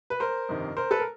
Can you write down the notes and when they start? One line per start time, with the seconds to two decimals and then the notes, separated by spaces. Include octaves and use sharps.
0.10 B4
0.20 A#4 C5
0.49 G1 F2 C3 D#3
0.77 A#4 C5
0.91 A4 B4
1.00 A#4